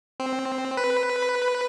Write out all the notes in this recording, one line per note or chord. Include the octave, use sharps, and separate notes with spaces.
C4
B4